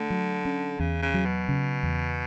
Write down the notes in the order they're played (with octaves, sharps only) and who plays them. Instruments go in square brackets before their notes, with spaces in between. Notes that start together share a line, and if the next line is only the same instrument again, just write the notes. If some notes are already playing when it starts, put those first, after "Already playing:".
Already playing: [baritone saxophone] D3 [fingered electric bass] A3
[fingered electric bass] F#3
C#4
[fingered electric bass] E2 [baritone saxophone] C#3
[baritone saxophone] C#3
[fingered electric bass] F#3
[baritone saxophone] B2
[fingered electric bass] C#3
E2